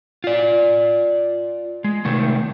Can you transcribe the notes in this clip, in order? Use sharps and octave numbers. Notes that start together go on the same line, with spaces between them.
F4 D5
G#3
C3 D#3 A3